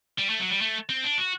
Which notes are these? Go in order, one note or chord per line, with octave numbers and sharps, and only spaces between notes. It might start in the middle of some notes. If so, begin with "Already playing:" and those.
G3
A3
F#3
G3
A3
C4
D4
F#4